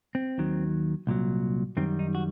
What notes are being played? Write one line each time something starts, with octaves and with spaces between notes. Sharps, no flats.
C4
D#2 D#3 F#3
C2 A#2 F#3
F#2 D#3 G3 C4
D#4
F#4